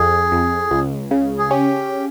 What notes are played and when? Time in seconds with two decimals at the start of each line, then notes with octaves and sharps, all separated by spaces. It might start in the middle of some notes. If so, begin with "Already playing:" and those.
Already playing: F2 G#4
0.32 F2
0.71 C#2
1.11 C#3
1.39 G#4
1.50 C#4 G4